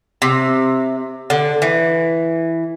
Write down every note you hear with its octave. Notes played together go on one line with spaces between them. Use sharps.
C3
D3
E3